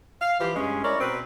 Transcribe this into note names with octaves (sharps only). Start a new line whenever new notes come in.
F5
E3 F3 G4
G2 G#3 C#4
E4 A#4 C#5 D5
B2 C4 B4